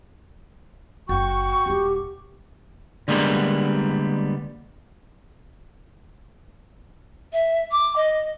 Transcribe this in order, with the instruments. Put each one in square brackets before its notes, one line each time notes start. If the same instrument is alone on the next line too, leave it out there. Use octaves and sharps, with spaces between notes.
[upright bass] F#1 C#4 [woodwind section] F#4 G5 C#6
[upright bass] D#1 C#4 [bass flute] G4
[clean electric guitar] D3 G3 G#3 A#3 B3
[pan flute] E5
D6
D#5